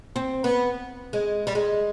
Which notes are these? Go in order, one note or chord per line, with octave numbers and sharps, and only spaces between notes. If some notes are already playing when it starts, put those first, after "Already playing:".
C4
B3
G#3
G3
G#3